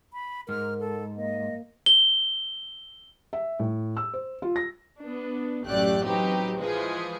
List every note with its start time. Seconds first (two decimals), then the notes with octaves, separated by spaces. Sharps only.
0.13 B5
0.49 G#2 A#4 F6
0.80 A4
1.17 A#3 D#5
1.86 G7
3.33 E5
3.60 A2
3.97 E6
4.14 C5
4.42 F4
4.56 A#6
5.00 B3 D4
5.66 A1 F#2 A3 G4 D5 F#6
6.05 F#3 C4 D#4 G4 B4
6.61 E3 F3 G#3 G#4 B4